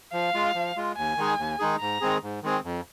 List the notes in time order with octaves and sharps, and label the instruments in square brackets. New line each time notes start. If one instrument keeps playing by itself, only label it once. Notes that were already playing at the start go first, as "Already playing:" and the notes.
[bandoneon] F3 [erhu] F5
[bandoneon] G#3 F4
F3
G#3 F4
[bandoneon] D#2 [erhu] G#5
[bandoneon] D#3 G#3 D#4 G#4
D#2
D#3 G#3 D#4 G#4
[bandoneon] G#2 [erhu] A#5
[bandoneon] D#3 G#3 C4 G#4
G#2
D#3 G#3 C4 G#4
F2